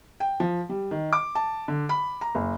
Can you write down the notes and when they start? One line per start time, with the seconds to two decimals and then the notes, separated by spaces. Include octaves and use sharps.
0.20 G5
0.40 F3
0.69 G3
0.91 D#3
1.13 D6
1.35 A5
1.68 D3
1.89 B5
2.21 A#5
2.35 F#1